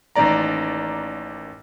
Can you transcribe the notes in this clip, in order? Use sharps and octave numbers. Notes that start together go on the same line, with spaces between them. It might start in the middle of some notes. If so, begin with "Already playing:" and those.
A1 D#3 A#3 D5 A#5